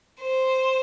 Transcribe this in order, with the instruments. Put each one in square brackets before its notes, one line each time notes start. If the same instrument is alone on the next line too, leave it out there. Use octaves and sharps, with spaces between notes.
[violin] C5